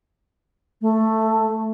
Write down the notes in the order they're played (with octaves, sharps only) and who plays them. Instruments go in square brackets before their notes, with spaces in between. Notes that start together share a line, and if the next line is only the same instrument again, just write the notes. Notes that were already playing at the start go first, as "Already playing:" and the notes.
[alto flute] A3